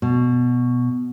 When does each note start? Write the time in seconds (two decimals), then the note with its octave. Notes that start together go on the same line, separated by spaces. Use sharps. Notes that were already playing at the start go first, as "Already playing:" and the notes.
0.02 B2